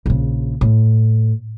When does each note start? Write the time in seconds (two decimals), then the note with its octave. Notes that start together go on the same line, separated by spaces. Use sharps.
0.06 A#1 C#3
0.61 A2